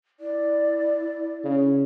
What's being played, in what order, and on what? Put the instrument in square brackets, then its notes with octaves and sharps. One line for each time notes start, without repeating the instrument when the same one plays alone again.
[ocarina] E4 [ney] D5
[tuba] C#3